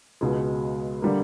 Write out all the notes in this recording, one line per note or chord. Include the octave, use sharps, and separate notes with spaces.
C#2 B2 G#3
D3 G3 A#3